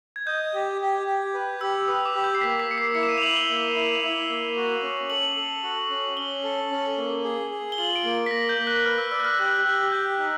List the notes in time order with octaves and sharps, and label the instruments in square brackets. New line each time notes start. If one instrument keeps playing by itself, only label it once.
[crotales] G#6
[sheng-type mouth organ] D#5 [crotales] G6
[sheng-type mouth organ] G4
G4
G4
B4
[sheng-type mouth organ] G4 [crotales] E6
[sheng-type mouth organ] B4 [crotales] D#6
[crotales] D6
[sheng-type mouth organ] G4
[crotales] G6
C7
[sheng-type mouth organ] A#3 [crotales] B6
[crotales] B6
[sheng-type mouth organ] A#3 [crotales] C#7
[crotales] C7
[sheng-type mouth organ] E4 [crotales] C#7
[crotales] E7
D#7
F7
[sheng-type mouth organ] E4 [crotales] F#7
[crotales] G7
[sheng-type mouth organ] A#3
E4
E4
A#3
F#4
C#4
[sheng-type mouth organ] A4 [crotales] F#7
[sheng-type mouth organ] A4
F#4
C#4
[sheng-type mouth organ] C#4 [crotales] G7
[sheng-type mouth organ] A4
C#4
A#3
G#4
G#4
[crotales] G7
[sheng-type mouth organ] F4 [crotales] F#7
[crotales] D7
[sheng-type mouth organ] A#3
[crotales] B6
[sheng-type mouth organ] A#3 [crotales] A#6
[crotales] G6
[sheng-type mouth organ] A#3
[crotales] F#6
[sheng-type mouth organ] B4 [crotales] F6
[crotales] E6
[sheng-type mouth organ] D5 [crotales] E6
[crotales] F#6
F6
[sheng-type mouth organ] G4 [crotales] F#6
[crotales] F#6
[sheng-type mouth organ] G4
[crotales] F#6
[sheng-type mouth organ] G4 [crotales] G6
[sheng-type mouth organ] D#4